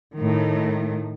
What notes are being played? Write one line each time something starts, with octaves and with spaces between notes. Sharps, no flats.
A2 D#3